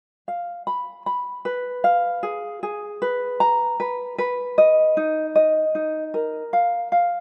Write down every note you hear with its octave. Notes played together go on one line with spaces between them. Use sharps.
F5
B5
B5
B4
F5
G#4
G#4
B4
A#5
B4
B4
D#5
D#4
D#5
D#4
A#4
F5
F5